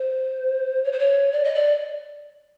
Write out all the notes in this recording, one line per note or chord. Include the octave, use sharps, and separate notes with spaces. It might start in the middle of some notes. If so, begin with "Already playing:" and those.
Already playing: C5
C#5
C5
C#5
D5
D#5
D5